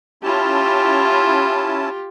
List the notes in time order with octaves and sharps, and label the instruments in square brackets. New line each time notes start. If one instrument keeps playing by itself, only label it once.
[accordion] C#4 E4 A5 [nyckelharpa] F4 G4